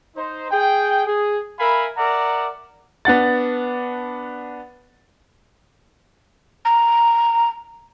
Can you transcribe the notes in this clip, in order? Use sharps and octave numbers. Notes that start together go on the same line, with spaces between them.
D#4 C5
G#4 G5
G#4
A#4 E5 F5 G#5 B5
A#4 D5 E5 F#5 A#5
B3 D4 F#5 A6
A#5